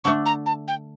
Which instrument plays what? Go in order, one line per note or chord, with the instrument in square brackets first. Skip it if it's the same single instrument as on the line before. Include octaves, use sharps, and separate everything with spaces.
[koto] D3 A3 D4 [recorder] C#6
[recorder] A#5
A5
G5